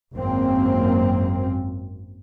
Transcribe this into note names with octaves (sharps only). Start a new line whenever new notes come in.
G#1 F#2 A#3 C4